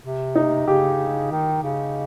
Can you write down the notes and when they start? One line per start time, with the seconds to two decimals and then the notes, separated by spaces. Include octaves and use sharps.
0.03 C3
0.35 D#4
0.67 C#3 G4
1.31 D#3
1.63 C#3